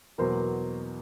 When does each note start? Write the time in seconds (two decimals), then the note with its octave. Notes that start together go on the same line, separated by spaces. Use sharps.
0.18 E2 B2 F#3 A#3 A#4 C5